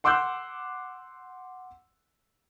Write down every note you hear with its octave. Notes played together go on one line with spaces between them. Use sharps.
F#5 C6 D6 E6 F#6 G6